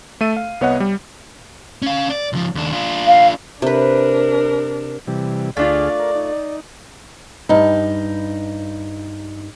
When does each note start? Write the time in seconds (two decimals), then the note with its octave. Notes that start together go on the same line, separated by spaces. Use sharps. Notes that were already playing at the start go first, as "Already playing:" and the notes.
0.21 A3 A4 E5 D#7
0.37 F5
0.61 C2 B3 C#5 D#5 F#5
0.80 G3
1.82 C#4 F5
2.10 D5
2.33 C#2 F3
2.55 D#2 D4
2.73 D4 F4
3.07 F5
3.62 C3 D4 A#4 B4
5.07 C3 E3 G3
5.57 D2 A3 D4 F4 G#4 D5 F5
6.00 A#4
6.15 D#4
7.49 G2 D#4